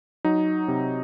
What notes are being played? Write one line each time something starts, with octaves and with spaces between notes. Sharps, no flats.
F#3 D#4
C3